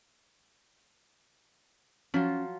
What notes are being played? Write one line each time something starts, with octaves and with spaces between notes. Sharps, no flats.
F3 F#3 C#4 F4